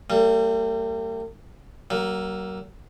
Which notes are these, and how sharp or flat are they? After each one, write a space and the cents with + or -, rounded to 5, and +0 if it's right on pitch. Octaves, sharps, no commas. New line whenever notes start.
G3 -5 A#3 -45
F#3 +35 A#3 +0